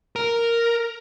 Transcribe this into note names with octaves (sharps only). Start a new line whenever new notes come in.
A#4